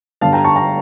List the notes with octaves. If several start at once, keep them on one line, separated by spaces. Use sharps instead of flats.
G1 G2 D3 F5 A5
G5 A#5
A5 C#6
G5 A#5